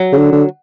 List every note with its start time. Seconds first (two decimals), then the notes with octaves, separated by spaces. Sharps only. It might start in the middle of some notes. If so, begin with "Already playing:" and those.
Already playing: F#3
0.12 C#3
0.18 D3
0.32 D3